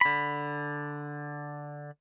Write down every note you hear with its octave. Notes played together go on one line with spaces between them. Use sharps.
D3 B5